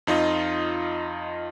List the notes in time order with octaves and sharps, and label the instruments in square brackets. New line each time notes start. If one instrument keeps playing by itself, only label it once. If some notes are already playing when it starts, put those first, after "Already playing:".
[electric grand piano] F2 D#4 F4 D#5